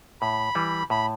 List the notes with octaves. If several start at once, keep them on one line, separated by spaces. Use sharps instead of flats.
A2 B5
E3 G3
A2 B5